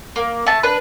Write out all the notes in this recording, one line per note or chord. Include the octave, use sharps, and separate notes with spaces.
A#3
A3 A5
D4 B4